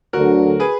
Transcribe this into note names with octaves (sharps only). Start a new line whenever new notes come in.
D2 D3 F#3 F#4 A#4
G#4 B4